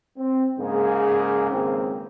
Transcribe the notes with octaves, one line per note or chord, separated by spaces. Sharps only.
C4
G#2 C#3 A#3 G#4
G#1 C#2 A#3 C4